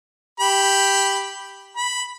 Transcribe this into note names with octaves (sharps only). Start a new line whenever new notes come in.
G4 B5
B5